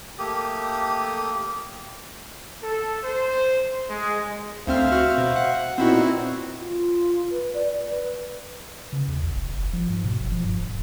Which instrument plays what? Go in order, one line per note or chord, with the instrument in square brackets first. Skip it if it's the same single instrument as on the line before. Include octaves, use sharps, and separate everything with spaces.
[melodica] A3 A#3 G4 D#6
[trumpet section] A4
C5
G#3
[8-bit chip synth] D2 C4 F6 [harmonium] C5 E5 F5
[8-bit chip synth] F#4 F6
B2
F#5
[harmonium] A#2 B3 D#4 [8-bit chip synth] C4 E4 F#4
[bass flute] F4
B4
D5
B4
[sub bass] C#3
E2
A1
E1
G1
F3
G#2
B2
G1
F3
G2
D1